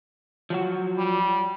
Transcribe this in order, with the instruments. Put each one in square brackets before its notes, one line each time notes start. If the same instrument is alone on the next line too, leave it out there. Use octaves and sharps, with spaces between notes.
[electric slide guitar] F3 F#3 F#4
[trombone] G3